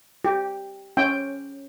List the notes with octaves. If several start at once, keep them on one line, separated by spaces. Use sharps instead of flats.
G4
C#4 G5